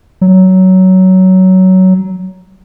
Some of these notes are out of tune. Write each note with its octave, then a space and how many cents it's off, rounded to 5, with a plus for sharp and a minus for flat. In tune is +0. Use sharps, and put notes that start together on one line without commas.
F#3 +15